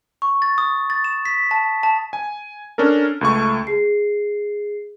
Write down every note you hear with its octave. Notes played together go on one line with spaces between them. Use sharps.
C#6
A6
D#6
A6
E7
B6
A5
A5
G#5
C#4 D4 A4 A#4
C#2 A3 C#6
G#4 C7